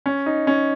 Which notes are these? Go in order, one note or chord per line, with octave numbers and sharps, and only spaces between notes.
C#4
D#4
C#4